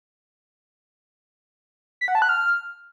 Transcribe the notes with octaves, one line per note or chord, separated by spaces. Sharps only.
B6
F#5
A5
F#6
F6